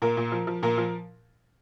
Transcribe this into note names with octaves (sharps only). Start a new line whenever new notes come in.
A#2 A#4
A#2
F3
F3
A#2 A#4
F3